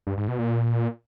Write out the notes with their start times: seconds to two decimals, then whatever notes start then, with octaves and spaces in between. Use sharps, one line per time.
0.07 G2
0.17 G#2
0.28 B2
0.39 A#2